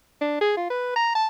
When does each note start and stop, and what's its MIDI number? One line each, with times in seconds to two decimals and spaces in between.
0.21 0.38 62
0.41 0.53 68
0.57 0.67 65
0.70 0.94 71
0.96 1.10 82
1.15 1.28 81